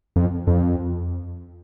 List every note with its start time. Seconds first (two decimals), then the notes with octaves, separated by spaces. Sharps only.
0.16 F2
0.47 F2